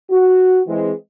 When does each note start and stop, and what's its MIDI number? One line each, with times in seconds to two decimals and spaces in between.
0.10 0.60 66
0.67 0.92 52
0.67 0.92 56
0.67 0.92 60